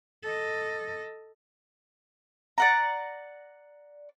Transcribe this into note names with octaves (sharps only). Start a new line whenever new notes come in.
A4 D#5
D5 F#5 A#5